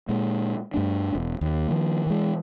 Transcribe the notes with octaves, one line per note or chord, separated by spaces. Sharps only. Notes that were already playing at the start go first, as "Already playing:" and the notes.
A#2 G#3
G2 A3 D4
E1
D#2
D#3 F3 A#3
E3 G#3